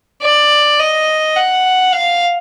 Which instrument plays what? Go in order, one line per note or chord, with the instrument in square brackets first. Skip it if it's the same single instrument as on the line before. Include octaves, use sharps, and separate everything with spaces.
[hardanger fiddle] D5
D#5
F#5
F5